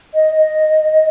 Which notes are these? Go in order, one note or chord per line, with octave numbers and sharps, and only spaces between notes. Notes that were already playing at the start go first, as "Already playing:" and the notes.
D#5
D#5